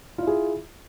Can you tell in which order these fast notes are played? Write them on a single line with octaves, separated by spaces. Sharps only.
F4 E4 G#4